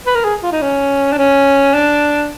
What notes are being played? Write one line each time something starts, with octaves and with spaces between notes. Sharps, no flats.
B4
A#4
G#4
F4
D#4
C#4
D4
C#4
D4